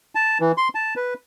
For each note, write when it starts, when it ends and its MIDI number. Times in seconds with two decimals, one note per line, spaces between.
0.15 0.38 81
0.40 0.52 52
0.57 0.68 84
0.75 0.94 81
0.96 1.14 71